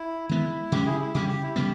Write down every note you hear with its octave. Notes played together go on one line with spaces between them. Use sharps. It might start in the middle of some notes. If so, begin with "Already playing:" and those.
Already playing: E4
D#3 G#3 B3 E4
C#3 G#3 C#4 G4
E4 G#4
E4
C#3 G3 C#4 G4
G4
E4
C#3 G3 B3 G4